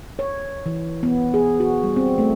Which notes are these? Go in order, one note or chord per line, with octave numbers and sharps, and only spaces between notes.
C#5
E3
B3
G#4
F#4
G3
C4
A3